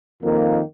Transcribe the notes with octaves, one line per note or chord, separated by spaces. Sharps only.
F2 D#3 A#3